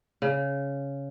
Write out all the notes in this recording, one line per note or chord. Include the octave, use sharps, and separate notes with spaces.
C#3